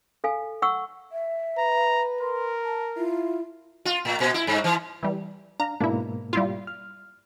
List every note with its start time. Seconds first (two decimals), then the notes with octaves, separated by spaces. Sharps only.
0.24 A4 F5 G#5
0.62 F#5 C#6 E6
1.12 E5
1.58 B4 A#5
2.21 A#4 C6
2.64 A5
2.97 E4 F4
3.85 F4
4.05 A2
4.20 A#2
4.34 E4
4.47 G2
4.64 E3
5.03 E3 G3
5.60 D4 F5 A#5
5.80 G#2 B2 A#3 D4 E4
6.33 G3 E4 F4
6.67 F6